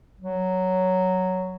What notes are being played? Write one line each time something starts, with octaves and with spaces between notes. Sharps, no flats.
F#3